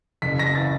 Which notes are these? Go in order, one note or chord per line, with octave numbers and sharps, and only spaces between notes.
F#1 B6
A#6
E3 A6